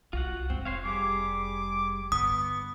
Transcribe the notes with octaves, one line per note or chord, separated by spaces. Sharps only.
C2 F4 F#4 F#5
F1 C4
F1 C5 C#5 F5
G3 G#4 D6
G2 D3 B3 D#6